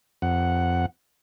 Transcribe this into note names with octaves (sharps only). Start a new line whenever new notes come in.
F2 F#5